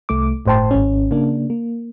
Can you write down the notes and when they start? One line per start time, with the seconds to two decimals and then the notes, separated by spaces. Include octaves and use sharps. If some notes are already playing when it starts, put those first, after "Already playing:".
0.09 C2 A3 D6
0.46 G1 A2 C5 G5 A5 C6
0.71 G#1 C#4
1.11 C#3 A#3 D4
1.50 A#3